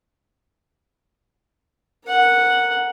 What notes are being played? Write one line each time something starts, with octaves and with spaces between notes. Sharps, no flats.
A#4 F#5